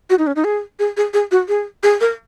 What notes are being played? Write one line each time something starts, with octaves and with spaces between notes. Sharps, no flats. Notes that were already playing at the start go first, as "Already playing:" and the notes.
F#4
D#4
C#4
D#4
G#4
G#4
G#4
G#4
F#4
G#4
G#4
A#4